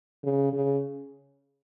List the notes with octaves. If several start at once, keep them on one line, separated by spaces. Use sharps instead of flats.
C#3
C#3